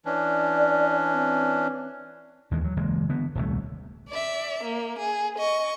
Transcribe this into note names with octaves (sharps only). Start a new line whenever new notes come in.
E3 C#4 D4 D5
C4
D#2 E3 G#3
F#3
F#1 E3 G#3 A#3
D3 B3
D#1 C2 A3
D5 E5
A#3
G#4
D#5 C#6